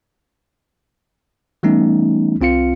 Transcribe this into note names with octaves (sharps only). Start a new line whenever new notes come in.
E3 G3 A3 B3 C#4 D#4
C2 C4 F4 F5 C#7